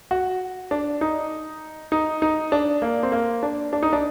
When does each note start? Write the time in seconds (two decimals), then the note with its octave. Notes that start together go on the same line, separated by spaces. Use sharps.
0.11 F#4
0.71 D4
1.01 D#4
1.92 D#4
2.22 D#4
2.52 D4
2.82 A#3
3.03 C4
3.12 A#3
3.43 D4
3.73 D4
3.83 D#4
3.93 D4